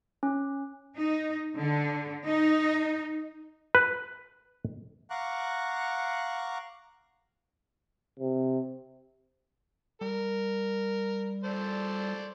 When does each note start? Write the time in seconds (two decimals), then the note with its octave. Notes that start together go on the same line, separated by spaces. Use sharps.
0.23 C#4
0.97 D#4
1.57 D3
2.26 D#4
3.75 B4
5.10 F5 F#5 A#5 C#6 D6 F#6
8.19 C3
10.01 G3 A#4
11.44 A4 C5 D5